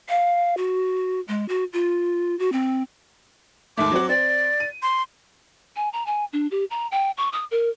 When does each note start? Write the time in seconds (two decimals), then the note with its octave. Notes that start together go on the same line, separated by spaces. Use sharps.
0.09 F5
0.57 F#4
1.28 G#3
1.49 F#4
1.73 F4
2.39 F#4
2.52 C4
3.77 D#2 G#2 A3 D6
3.91 F#3 C4 F#4
4.09 C4 D5
4.60 D#7
4.83 C6
5.76 G#5
5.93 A#5
6.06 G#5
6.33 D4
6.51 G4
6.70 A#5
6.92 G5
7.17 C#6
7.33 D#6
7.51 A#4